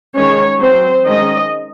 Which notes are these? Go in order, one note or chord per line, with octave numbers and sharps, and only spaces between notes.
D#3 G#3 C#4 C#5
F#3 C4 C5
D#3 G#3 C#4 D#5